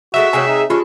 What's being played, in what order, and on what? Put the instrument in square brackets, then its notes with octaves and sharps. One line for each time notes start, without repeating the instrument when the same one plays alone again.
[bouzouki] F#3 G#3 A3 [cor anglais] F#4 [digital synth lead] E5
[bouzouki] C3 G#3 G#4 [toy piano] C#5 G#5
[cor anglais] D#4
[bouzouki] G#3 D4 A4 [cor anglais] C#4 [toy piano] F4 G4